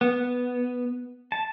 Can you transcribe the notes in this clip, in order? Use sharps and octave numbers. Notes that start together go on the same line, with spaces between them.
B3
A5